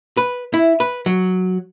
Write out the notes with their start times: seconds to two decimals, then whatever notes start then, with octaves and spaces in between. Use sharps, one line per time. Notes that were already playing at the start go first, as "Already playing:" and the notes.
0.17 B4
0.54 E4
0.80 B4
1.06 F#3